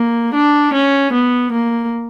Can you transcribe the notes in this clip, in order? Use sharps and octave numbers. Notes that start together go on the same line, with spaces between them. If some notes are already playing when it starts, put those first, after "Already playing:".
Already playing: A#3
D4
C#4
B3
A#3